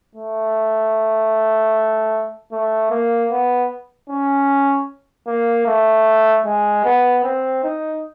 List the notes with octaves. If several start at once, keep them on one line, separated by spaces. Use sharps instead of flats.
A3
A3
A#3
B3
C#4
A#3
A3
G#3
B3
C4
D#4